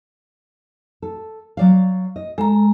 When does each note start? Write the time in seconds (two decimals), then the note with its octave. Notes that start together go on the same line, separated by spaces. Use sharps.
1.02 A4
1.57 F#3 D5 F5
2.16 D#5
2.38 G#3 A4 A#5